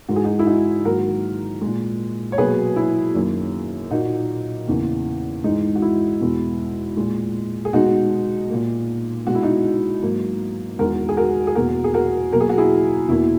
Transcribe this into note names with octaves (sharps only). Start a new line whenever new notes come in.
G#2 E3 G#3 F#4
G#4
D#4 F#4
E4
D#4 F#4
G#2 D#3 F#3 A#3 F#4 A#4
A#2 G#3
C#5
B2 F#3 A#3 G#4 B4
E4
F#2 D#3 A#3
A#2 A#3 D#4 F#4
E2 C#3 E3 A#3
G#2 E3 G#3 D#4
F#4
E4
E2 B2 G#3
A#2 G#3
G#4
B2 G#3 D#4 F#4
A#2 A#3
B2 G#3 F#4
E4
D#4 F#4
G#2 F#3 A#3
E2 D#3 G#3 F#4 A#4
G#4
F#4 A#4
G#4
E2 B2 A#3 F#4 A#4
G#4
F#4 A#4
B2 F#3 A#3 A#4
G#4
F#4
E4 G#4
E2 B2 A#3 E4